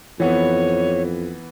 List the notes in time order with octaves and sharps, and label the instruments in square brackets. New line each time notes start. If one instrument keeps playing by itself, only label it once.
[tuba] F2 [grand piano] E3 B3 [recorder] C#5